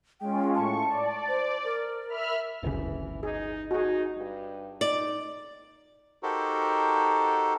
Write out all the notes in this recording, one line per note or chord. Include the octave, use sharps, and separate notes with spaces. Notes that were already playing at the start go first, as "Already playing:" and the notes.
G#3 C#4 F4 G5
A2 A5 C#6
D5
C5
A#4
E5 B5 F6
D1 G1 C#3 E3
D#4 G#4
D#4 F#4 G#4
G2
D#4 D5
D#4 F#4 G4 A4 A#4 C5